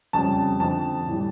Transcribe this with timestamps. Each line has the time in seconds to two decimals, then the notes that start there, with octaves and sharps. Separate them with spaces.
0.13 F2 C#3 G3 A5
0.60 F2 D3 F3 A5
1.06 A2 E3 G3